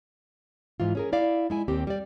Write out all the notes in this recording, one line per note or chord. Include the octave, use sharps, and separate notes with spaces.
G#2 E3 F4
C#4 G#4 A#4
E4 D5 F5
G#3 E4 G#5
D#2 C4 G4
G3 D5